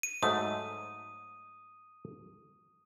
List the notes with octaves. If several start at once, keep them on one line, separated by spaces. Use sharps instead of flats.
D#7
G#2 F#3 A3 D#6